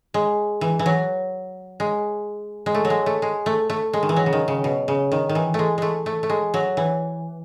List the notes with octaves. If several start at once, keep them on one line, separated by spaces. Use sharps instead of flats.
G#3
E3
E3
F#3
G#3
G#3
A3
F#3
G#3
A3
G#3
A3
A3
G#3
D#3
E3
F#3
C#3
D#3
C#3
B2
C#3
D#3
D#3
E3
G#3 A3
G#3 A3
A3
A3
G#3
F#3
E3